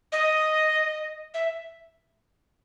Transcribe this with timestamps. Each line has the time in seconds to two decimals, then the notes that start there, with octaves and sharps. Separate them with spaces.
0.12 D#5
1.34 E5